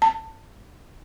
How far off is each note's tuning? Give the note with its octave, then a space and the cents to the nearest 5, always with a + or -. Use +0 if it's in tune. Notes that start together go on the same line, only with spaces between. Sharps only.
A5 +20